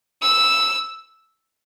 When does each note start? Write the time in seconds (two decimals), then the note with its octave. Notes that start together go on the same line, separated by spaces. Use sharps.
0.22 E6